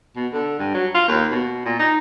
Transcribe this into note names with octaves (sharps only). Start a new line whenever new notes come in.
B2
D3
G2
F#3
F4
D#2
B2
A#2
D#4